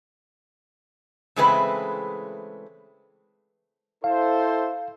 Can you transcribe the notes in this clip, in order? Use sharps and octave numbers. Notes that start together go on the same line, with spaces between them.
C#3 E3 G#3 A3 C4 B4
E4 A4 C5 F5